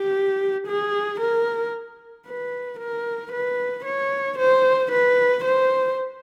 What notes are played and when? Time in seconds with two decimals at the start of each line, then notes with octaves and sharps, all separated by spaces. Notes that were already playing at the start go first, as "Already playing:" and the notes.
Already playing: G4
0.67 G#4
1.20 A#4
2.27 B4
2.79 A#4
3.32 B4
3.85 C#5
4.39 C5
4.92 B4
5.45 C5